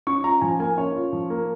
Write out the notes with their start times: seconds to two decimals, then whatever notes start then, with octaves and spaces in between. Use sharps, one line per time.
0.07 C#4 C#6
0.24 F4 A#5
0.41 F3 G#5
0.59 A#3 G#5
0.78 C#4 C#5
0.95 F4
1.13 F3
1.30 A#3